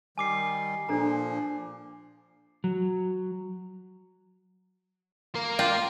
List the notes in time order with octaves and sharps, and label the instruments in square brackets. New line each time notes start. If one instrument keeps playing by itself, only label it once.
[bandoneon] D#3 G3 [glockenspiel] G#5 D6 C7
[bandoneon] A#2 F3 [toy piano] D4 A4 A#5
[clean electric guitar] F#3
[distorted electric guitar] A#3 A#4
[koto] F4 [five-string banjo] D5 G5